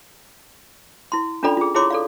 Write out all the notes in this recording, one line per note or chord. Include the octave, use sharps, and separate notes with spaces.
E4 C6
C#4 D4 F4 A4 D5 B5
F4 G#4
E4 F4 G#4 C#5 C6 D6
A4 D5 F5